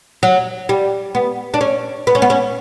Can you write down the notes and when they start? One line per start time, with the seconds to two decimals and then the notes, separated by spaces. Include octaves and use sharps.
0.23 F#3
0.69 G3
1.15 B3
1.54 D4
1.61 C#4
2.07 B3
2.15 C#4
2.22 B3
2.30 C#4